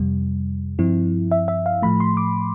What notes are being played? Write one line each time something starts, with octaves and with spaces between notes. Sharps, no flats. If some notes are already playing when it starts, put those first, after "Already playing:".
Already playing: F2 C3 G3
G2 F3 C4 E4
E5
E5
F5
A2 F3 A3 B5
C6
D6